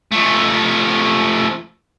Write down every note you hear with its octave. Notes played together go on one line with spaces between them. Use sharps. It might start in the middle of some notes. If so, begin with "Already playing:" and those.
F3 A3